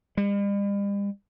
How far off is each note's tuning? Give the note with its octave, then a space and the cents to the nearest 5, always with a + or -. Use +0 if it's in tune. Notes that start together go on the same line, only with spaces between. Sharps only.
G3 +45